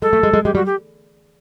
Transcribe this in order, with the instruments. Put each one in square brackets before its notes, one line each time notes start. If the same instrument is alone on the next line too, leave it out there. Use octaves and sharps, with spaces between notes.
[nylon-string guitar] G#3 [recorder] A4
[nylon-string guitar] A3
G#3
G#3
[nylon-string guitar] G#3 [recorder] G4
[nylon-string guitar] G3 [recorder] F#4
[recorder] G4